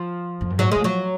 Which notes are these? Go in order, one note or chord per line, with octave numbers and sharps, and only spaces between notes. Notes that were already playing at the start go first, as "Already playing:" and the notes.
Already playing: F3
F2
F#2
G#2 F#3
D#3 G#3
F3 F#3